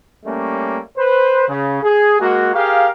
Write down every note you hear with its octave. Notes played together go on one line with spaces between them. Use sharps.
G3 A3 A#3 C#4
B4 C5
C#3
G#4
G#3 A#3 F#4
G4 G#4 A#4 F5